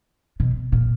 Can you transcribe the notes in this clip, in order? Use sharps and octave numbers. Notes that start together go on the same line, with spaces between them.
B2
A#2